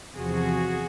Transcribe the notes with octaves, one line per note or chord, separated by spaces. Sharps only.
E2 C3 F3 F#4 G#4